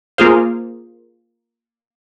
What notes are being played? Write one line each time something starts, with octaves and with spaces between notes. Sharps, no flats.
A#3 F4 G#4 C5 F5